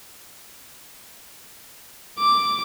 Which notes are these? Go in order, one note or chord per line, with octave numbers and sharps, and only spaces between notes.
D6